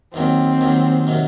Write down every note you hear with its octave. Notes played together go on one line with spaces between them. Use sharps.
D#2 D#3 F#3 C4
D#2 D#3 F#3
C3 D#3 F#3